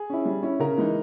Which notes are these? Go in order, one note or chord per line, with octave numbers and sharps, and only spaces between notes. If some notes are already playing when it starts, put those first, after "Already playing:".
Already playing: G#4
C#4 E4
G3
C#4 E4
C#3 A#4
E3 G#3 D#4